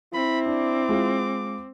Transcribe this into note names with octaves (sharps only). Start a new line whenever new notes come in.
C4 E4 B5
D4 D6
G#3 F4